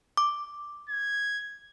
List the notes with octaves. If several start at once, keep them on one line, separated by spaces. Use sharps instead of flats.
D6
G#6